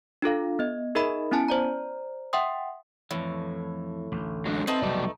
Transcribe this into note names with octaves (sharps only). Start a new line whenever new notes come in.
D4 F4 A4 F5
B3 D#5
D#4 G#4 A#4 D#5 E5 B5
B3 C#4 E4 G#5 A5
C5 D5 A#5
E5 F#5 G5 C6 D#6
F2 A2 E3
A1 D2
F#3 G#3 D4
A3 C4 D#4 B4 A5
F1 B1 G3 F#4 D5